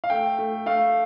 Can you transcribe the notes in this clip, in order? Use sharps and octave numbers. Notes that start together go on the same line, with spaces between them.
F5
A3 G5
A3
A3 F5